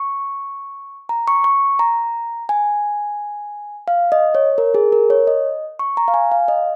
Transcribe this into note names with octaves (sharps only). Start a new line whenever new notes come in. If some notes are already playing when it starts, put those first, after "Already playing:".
Already playing: C#6
A#5
C#6
C#6
A#5
G#5
F5
D#5
C#5
A#4
G#4
A#4
C#5
D#5
C#6
A#5
F5
G#5
F5
D#5